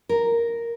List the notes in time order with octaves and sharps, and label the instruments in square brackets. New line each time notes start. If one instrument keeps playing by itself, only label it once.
[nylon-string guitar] A#4